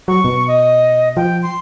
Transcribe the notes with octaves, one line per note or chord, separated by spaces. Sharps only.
F#3 C#6
B2
D#5
F3 G5
C6